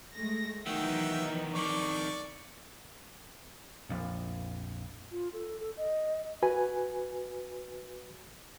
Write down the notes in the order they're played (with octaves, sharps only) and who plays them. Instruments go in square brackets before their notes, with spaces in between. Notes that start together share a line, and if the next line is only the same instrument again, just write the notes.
[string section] G#3 A3 A#6
[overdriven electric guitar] D#3 B3 [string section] E3 F#3 D#4 [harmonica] F#4 E5 G5
[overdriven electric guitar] F2 D#3 [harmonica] D5 C#6 D6
[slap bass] A#1 F2
[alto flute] F4
A4
A4
D#5
[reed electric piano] F#4 B4 G#5